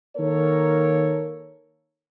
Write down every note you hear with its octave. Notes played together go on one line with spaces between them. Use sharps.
D#3 A#3 A4 A#4 C#5